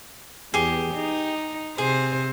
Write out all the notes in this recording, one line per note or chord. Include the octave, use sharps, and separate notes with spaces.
E2 G4 G#4
D#4
C3 G#4 C5